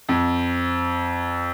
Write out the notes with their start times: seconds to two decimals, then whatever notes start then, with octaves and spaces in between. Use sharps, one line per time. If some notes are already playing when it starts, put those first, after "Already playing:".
0.09 F2